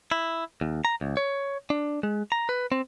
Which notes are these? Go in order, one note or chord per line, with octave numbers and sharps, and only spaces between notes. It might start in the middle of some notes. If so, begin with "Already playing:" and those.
E4
D#2
A#5
C#2
C#5
D4
G#3
A#5
B4
C4